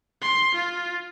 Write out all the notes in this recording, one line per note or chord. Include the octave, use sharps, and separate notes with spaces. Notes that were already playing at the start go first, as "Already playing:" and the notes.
C6
F4